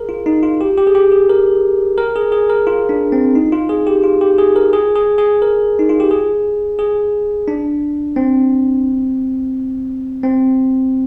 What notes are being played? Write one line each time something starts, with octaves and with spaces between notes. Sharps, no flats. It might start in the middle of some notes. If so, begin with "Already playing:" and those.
Already playing: G#4 A#4
F4
D#4
F4
G4
G4
G#4
G4
G#4
A#4
A#4
G#4
G#4
A#4
F4
D4
C4
D#4
F4
G#4
G4
F4
G4
G#4
A#4
G#4
G#4
G#4
A#4
D#4
F4
G4
G#4
G#4
D4
C4
C4